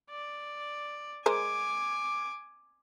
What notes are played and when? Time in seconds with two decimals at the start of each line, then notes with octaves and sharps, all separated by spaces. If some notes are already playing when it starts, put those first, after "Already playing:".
0.10 D5
1.26 G#3 A#4 C5 G#5 D6